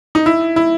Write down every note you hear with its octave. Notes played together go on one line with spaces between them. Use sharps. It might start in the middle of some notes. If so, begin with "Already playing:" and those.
D#4
E4
E4